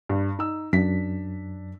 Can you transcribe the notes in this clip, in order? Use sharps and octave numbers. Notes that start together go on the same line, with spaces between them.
G2
D#4 E6
F#2 D4 B6